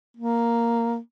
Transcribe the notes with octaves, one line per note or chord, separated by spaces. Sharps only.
A#3